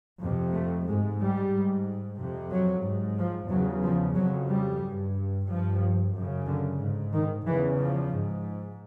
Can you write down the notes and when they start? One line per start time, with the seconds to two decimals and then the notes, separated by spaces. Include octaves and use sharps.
0.21 F2 C3
0.54 A3
0.87 G#2 G#3
1.20 G3
1.53 G#2
2.19 F2 C3
2.51 F#3
2.84 G#2
3.18 F3
3.50 E2 C#3 F#3
3.84 F3
4.16 F2 C#3 F#3
4.50 G3
4.83 G2
5.48 G2 F3
6.14 F#2 C#3
6.47 D3
6.81 G#2
7.13 D#3
7.46 E2 C#3 E3
7.78 F3
8.12 G#2